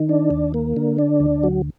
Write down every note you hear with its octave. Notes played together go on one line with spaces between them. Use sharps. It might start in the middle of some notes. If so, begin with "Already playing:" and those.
Already playing: D#3
D4
D#2
A#3
D3
D4
D2
F#3